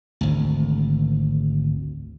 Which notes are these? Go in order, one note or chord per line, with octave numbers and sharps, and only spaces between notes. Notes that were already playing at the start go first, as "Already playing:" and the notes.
G#1 D2